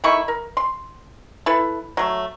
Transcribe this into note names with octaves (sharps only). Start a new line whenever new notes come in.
D#3 A3 E4 C#6
A#4
C6
E4 A4 B4
F#3 A3